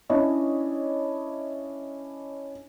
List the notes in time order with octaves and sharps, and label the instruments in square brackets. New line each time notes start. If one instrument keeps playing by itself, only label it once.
[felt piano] C#4 D4 E4 C#5 D#5